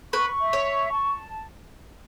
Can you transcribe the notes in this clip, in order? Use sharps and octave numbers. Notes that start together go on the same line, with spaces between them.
B4 C#6
E5
C#5
C#6
A5